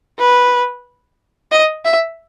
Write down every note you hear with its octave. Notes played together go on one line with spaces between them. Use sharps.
B4
D#5
E5